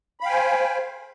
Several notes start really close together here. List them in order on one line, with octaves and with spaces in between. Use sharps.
B5 F5 G5 G#5 C5